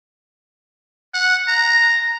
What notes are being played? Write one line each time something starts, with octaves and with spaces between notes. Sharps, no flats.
F#5
A#5